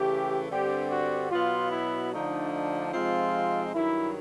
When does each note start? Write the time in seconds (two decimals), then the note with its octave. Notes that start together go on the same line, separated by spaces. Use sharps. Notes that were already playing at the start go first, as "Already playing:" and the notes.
Already playing: C#3 E3 A3 G4
0.50 G2 D3 G3 C4 G4
0.90 F#4
1.31 B2 F#3 B3 F4
1.71 E4
2.12 D3 F3 A3 D4 D#4
2.52 D#4
2.93 C3 F3 G#3 C4 D#4 F4
3.74 G2 D#3 F#3 E4